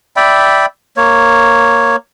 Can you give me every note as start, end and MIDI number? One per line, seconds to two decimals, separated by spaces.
0.16 0.66 74
0.16 0.66 76
0.16 0.66 79
0.16 0.66 83
0.97 1.96 58
0.97 1.96 73